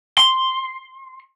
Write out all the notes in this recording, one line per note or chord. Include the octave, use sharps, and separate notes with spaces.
C6